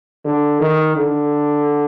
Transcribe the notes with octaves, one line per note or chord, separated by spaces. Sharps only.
D3
D#3
D3